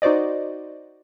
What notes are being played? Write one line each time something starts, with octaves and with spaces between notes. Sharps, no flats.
D#4 F#4 C5 D5 D#5